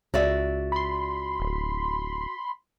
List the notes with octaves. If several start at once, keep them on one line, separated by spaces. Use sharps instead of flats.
C#2 F#4 D5 E5
B5 C6
D1